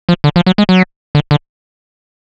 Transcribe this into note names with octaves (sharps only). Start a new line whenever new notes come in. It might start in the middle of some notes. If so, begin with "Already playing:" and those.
F3
D3
F3
F#3
G#3
F#3
D3
D3